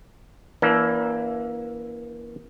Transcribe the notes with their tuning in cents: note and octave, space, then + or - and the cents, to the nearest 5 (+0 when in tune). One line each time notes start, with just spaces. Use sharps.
E3 +0 A#3 +20 D4 -35